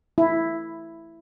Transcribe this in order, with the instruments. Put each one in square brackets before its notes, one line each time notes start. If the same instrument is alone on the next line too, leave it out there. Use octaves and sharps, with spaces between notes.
[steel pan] E4